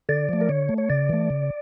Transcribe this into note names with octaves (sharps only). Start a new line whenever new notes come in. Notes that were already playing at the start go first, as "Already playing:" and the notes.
D3 D5
F3 A3
A#4
D3 C#5
A3
C#5
C#3 D5
E3 A3
C#3